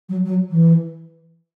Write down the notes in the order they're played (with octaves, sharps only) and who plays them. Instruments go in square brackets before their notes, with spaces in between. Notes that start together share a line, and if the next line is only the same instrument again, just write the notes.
[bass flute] F#3
F#3
E3